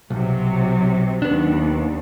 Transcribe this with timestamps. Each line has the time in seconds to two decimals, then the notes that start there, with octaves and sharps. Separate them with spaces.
0.10 B1 C3 F#3
1.22 D#2 B3 D4